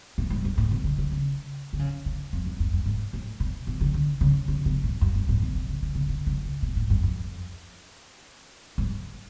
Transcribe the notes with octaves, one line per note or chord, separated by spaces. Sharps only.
A2
G#2
F#2
A2
B2
D3
C#3
C#3
D3
C#3
D3
F2
F#2
F2
F#2
G#2
A2
B2
B2
C#3
D3
C#3
C#3
B2
A2
F#2
F#2
A2
B2
B2
C#3
D3
C#3
D3
C#3
C#3
B2
A2
F#2
F2
G#2